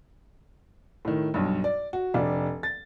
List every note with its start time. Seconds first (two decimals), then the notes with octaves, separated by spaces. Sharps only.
1.05 A2 D#3
1.34 B1 G2
1.64 D5
1.93 F#4
2.14 F1 D4
2.63 A6